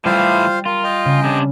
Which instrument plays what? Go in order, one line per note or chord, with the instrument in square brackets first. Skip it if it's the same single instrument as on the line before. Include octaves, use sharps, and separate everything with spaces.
[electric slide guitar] A2 E3 E4 [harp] G3 [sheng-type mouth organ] F4 C5 F5
[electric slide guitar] F4 [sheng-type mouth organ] A#4
[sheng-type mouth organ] D#5 G5
[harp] C#3
[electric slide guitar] C3 D4